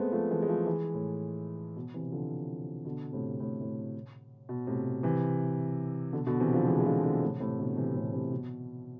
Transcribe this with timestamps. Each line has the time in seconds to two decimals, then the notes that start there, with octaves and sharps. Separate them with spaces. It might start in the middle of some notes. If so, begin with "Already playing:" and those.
Already playing: G#3 A3 B3 C4
0.12 F3 A3
0.31 E3 G#3
0.42 G#3
0.48 F3 A3
0.66 E3 G#3
0.94 A2
1.76 B2
1.94 C3 E3
2.12 D3 F3
2.85 B2 D3
3.13 A2 C3
3.40 A2
3.61 A2
4.49 B2
4.67 A2 C3
5.03 C3 E3
6.13 B2 D3
6.27 B2 D3
6.40 C3 E3
6.54 D3 F3
6.67 E3 G#3
6.80 G#3
6.86 D3 F3
7.03 B2 D3
7.22 A2 C3
7.40 A2 C3
7.59 B2 D3
7.77 C3 E3
7.95 A2 C3
8.13 A2 C3
8.32 B2